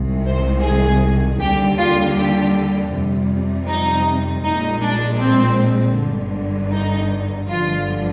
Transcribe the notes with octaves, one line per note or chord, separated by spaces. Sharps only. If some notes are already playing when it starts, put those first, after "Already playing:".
Already playing: C2 C3 D#3 G#3
C5
G#4
D#2 D3 G3 G4
F4
G4
F2 C3 G3
D#4
A#1 A#2 G#3 D#4
D4
C4
G1 G2 D3
D#4
G1 G2 D3 F3 F4